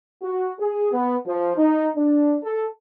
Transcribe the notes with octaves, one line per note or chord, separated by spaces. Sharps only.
F#4
G#4
B3
F3
D#4
D4
A4